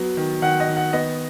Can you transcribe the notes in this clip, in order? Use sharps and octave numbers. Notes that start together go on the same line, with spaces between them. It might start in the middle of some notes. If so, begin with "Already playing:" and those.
Already playing: F#3 B3
D#3
D#3 F#5
D#5
D#3
F#5
B3 D#5